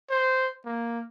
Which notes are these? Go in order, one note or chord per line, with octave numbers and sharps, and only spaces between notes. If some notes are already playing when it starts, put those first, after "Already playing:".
C5
A#3